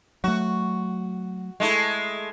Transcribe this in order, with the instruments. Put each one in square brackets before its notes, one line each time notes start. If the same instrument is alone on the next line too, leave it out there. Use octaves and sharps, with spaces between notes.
[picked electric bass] F#3 A3 [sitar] F#4
[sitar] G#3 A3 E4